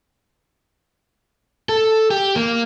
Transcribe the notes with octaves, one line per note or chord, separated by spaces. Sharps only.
A4
G4
A#3